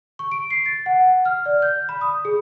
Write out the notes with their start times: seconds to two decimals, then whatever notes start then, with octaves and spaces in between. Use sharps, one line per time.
0.19 C#6
0.31 D7
0.51 C7
0.66 A6
0.86 F#5
1.25 F6
1.46 D5
1.62 G6
1.89 B5
2.01 D#6
2.25 G#4